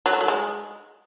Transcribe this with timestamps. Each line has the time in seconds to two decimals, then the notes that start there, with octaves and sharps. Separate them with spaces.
0.06 F#3
0.13 A3
0.21 F#3
0.28 G#3